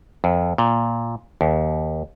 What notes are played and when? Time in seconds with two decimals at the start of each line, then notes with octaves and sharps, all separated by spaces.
0.24 F2
0.58 A#2
1.41 D#2